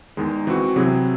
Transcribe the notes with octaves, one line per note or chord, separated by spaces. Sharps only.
E2 D#3 G#3 D#4
E3 C4 F#4
C3 F#3 C4 E4 G#4